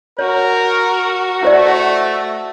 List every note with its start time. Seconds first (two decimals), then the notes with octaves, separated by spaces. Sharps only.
0.19 F#4 A#4 C#5
1.43 A3 E4 C5 D5